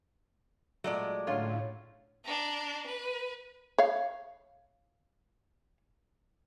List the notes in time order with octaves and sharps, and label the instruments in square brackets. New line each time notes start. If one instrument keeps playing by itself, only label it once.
[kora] A#2 A3 [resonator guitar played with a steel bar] F#3 G#3 D5
[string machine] A2 [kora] D3 C#4 C#5 [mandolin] F4
[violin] D4 A#5
B4
[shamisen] C#5 F5